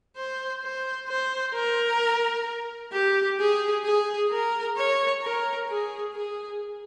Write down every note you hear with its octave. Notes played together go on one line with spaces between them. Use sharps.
C5
C5
C5
A#4
G4
G#4
G#4
A#4
C#5
A#4
G#4
G#4